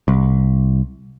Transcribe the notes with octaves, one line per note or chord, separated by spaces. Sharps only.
C2